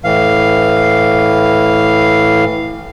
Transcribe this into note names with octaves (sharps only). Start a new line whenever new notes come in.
A2 E3 F5